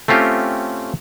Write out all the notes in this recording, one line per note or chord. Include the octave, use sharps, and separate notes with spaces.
A3 C4 C#4 F4 G4